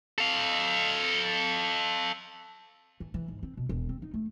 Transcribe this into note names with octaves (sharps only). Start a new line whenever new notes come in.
A4 F5
E3
E3
G#2
C4
B2
E1
C4
D#4
A3